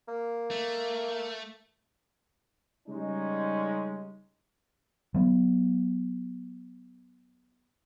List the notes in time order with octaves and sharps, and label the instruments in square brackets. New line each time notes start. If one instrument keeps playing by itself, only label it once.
[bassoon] A#3
[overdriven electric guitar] A3
[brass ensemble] C#3 G3 G#3 C#4 D#4
[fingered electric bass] F#3 B3